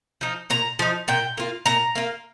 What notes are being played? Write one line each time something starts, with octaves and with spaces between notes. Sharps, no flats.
F3 D#4
A#2 A#5
F3 D#4
A#2 G5
A#3 F4
A#2 A#5
A#3 F4